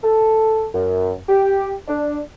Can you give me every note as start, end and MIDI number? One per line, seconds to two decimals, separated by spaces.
0.04 0.66 69
0.74 1.14 42
1.29 1.72 67
1.88 2.19 62